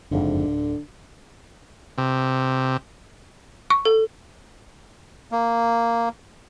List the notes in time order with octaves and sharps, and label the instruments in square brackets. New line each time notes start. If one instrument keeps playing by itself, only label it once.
[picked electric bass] F#1 F2 G#2 [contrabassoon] D3
[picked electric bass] D1
[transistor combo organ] C3
[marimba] C#6
[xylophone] A4
[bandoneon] A#3